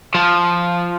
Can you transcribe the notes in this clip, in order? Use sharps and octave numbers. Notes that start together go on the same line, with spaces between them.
F3